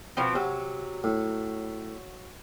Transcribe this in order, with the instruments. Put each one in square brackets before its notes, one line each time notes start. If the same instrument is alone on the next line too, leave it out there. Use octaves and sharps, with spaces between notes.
[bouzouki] B2 F3 C4
[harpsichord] C3 [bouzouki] F#3
[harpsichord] A2